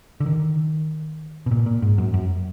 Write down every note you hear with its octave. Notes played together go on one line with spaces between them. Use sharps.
D3
D#3
B2
A#2
A#2
G#2
F#2
F#2